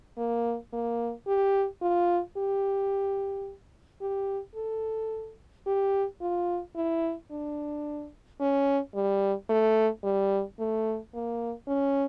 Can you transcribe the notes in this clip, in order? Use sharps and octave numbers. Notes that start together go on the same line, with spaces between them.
A#3
A#3
G4
F4
G4
G4
A4
G4
F4
E4
D4
C#4
G3
A3
G3
A3
A#3
C#4